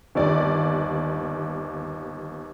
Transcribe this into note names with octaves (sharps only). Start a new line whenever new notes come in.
G1 D#2 D5